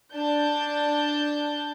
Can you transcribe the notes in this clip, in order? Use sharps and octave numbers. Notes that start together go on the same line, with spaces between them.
D4 A5 G6